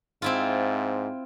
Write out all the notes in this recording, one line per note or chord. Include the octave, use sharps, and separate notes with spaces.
G#2 C4 E4 F4